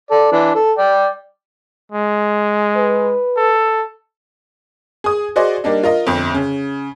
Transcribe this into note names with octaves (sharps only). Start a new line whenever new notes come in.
A4 D5
E3 D4
A4
D5 G5
G#3
B4
A4
G#4 D#6
F#4 G#4 C5 D5 D#5
G3 A#3 D4 D#4
F4 A#4 D#5
G1 F2
C#3